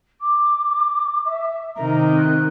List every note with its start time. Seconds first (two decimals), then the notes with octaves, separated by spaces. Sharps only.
0.21 D6
1.25 E5
1.76 C3 D#3 A#5
2.17 F#6